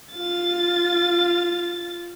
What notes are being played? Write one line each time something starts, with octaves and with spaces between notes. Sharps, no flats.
F4 A6